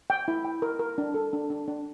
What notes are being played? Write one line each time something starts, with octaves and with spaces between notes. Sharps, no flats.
G5
E4
G5
A#4
A#4
D4
A4
D4
D4
D4